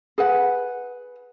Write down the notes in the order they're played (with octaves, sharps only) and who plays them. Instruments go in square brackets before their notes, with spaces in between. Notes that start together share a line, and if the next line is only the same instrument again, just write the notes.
[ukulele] G#4 B4 F#5